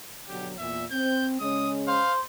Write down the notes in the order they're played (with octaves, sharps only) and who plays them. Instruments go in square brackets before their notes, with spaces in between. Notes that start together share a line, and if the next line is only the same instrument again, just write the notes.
[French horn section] B2 D3 F#3 [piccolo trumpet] G4
[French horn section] E2 A#2 [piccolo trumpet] E5
[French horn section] C4 [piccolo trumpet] G6
[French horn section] C#3 G#3 C#4 [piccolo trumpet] D#6
[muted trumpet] C5 [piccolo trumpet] F5